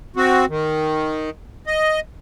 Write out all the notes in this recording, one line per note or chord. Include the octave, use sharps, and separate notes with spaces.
C4 F#4
D#3
D#5